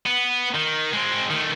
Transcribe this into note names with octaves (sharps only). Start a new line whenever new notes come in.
B3
D#3
G#3 C4
D#3 A3